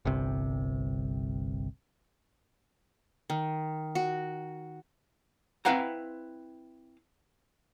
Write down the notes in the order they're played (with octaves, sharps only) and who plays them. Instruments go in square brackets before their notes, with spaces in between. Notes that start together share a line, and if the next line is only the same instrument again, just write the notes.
[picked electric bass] G1 C2 C3
[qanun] D#3
F#4
[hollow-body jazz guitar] C4 E4 B4 F5 F#5 A#5